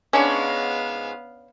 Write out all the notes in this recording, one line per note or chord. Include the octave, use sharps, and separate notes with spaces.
G#2 G#3 B3 C#4 D4 C#5 F5